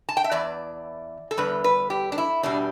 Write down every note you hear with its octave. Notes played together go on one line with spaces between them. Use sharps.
A5
G5
E5
E2 E3 D5
A4
E2 D3 G3 B4
B4
G4
D4
E4
E2 B2 G3 D4